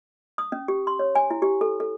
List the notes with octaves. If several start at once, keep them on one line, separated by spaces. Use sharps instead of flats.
D#6
C#4
G4
C6
C#5
G#5
E4
G4
A4
A4